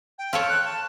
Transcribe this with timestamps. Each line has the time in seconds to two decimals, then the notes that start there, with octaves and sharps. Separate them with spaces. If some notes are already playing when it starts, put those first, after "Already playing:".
0.18 G5
0.33 F4 A4 C#5
0.49 F#6
0.65 A5